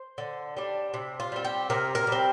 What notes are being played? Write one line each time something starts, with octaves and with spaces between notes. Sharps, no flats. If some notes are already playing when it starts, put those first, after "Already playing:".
Already playing: C5
D3
G3 D4
C3
F4
G3 C4
G4
C3 A#4
A#4
G3
C4